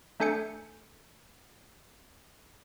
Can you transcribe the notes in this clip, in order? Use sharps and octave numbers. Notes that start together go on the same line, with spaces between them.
A3 D4 A4 G#5 G6 C#7